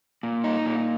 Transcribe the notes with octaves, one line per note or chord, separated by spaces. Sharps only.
A#2
D#4
A#2